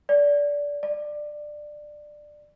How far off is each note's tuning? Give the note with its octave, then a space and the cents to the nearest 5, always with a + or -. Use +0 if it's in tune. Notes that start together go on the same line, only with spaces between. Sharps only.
D5 -20
D5 +15